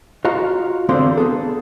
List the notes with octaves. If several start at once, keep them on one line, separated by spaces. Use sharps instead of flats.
F4 F#4 D#5 F5 A#5
E2 D3 A#3 C4 F5 C6
B3 G#4 A4